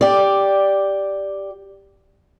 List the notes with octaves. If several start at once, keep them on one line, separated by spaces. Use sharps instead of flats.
G4 D5